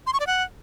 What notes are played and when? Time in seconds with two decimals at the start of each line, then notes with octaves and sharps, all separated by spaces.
0.07 C6
0.13 C#6
0.20 D5
0.27 F#5